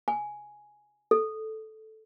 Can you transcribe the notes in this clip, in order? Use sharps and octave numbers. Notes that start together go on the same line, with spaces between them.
G#5
A4